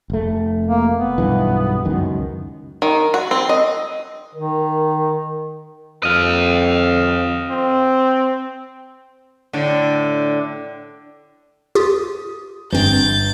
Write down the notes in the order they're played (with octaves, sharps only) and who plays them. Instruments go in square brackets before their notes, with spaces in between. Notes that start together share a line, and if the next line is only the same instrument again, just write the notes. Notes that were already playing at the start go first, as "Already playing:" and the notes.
[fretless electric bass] F1 A3
[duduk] A#3
B3
[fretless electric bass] B1 G2 E3
C#2 F#2 D#3
[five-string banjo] D#3
F#4
C4
D#5
[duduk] D#3 [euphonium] A#4
[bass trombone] F2 [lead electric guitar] D#5 F5
[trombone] C4
[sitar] A2 D3
[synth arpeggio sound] F4 G4 [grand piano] D#6
[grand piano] G1 [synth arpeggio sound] E3 C4 [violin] G6 A6